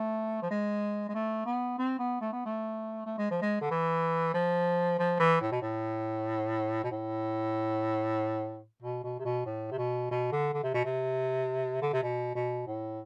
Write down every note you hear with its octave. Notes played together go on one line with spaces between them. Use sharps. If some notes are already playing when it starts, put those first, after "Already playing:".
Already playing: A3
F3
G#3
G#3
A3
B3
C4
B3
A3
B3
A3
A3
G#3
F3
G#3
D3
E3
F3
F3
E3
A2
B2
A2
B2
A2
B2
B2
C3
B2
A2
C3
B2
B2
D3
D3
C3
B2
C3
D3
C3
B2
B2
A2